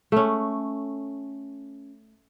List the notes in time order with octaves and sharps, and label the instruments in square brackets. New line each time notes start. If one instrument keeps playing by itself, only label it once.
[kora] A3 C#4